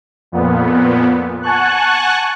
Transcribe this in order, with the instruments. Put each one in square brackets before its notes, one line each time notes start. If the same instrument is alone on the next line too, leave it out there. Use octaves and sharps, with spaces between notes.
[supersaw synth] F2 A#2 B3
F#5 G#5 A5 C#6 F#6